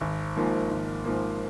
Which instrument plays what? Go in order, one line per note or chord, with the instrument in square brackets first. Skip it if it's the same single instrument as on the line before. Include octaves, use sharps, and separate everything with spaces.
[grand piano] G#1
G#2 F3 A#3
G#1
G#2 F3 A#3